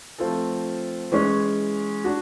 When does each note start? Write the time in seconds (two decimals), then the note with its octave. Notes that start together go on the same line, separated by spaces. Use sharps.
0.18 F3 A3 C4 F4 A4
1.12 E3 G#3 C#4
2.04 D4 F#4